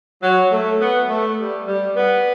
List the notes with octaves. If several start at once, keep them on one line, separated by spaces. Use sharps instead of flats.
F#3
A3
B3
A3
G3
G3
B3